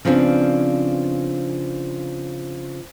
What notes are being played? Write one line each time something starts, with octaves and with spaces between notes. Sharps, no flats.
C#3 F3 B3 C4 D4